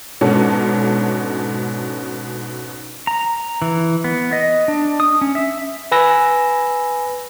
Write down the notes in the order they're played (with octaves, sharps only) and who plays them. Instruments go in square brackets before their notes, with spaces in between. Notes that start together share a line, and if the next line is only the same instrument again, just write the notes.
[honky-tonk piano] G#2 B2 C#4 D4 A4
[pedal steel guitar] A#5
E3
B3
D#5
D4
D#6
C#4
E5
[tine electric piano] B4 G#5 B5 E6 A#6